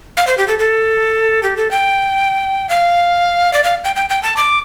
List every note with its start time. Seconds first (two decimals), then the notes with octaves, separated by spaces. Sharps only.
0.17 F5
0.27 C5
0.38 G4
0.48 A4
0.59 A4
1.43 G4
1.57 A4
1.71 G5
2.69 F5
3.53 D5
3.64 F5
3.85 G5
3.96 G5
4.09 G5
4.23 A5
4.37 D6